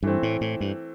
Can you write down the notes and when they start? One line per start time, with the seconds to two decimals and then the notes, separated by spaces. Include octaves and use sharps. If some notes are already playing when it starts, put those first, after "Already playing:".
0.03 G2 E3 A3 C4
0.23 A2
0.41 A2
0.61 G2